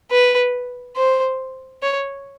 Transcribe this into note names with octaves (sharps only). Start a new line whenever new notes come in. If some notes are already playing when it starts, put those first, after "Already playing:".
B4
C5
C#5